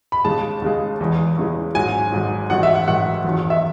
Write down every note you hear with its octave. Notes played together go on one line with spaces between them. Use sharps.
B5
D#2 C#3 G#3 A5
D#2 C#3 G#3
E2 C#3 E3 G#3
E2 C#3 E3 G#3
G#1 G#2 F#3 G#5
G#1 G#2 F#3
A1 G#2 D#3 F#3 F#5
E5
F#5
A1 G#2 D#3 F#3 F#5
F#1 E2 D#3 F#3
E5